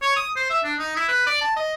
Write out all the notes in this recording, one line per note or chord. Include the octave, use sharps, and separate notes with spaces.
C#5
D#6
C5
E5
D4
D#4
E4
B4
D5
A5
D#5